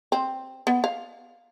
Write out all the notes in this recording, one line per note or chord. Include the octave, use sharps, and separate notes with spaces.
C4
B3
F5